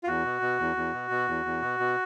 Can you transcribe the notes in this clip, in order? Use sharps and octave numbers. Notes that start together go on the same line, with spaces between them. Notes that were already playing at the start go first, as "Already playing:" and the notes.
F4
E2 F#4
B2
B2
E2
E2
B2
B2
E2
E2
B2
B2